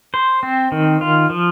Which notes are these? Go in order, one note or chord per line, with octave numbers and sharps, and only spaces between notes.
C5
C4
D#3
F4
F3